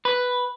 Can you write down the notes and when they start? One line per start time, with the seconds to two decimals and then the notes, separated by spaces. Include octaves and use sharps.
0.05 B4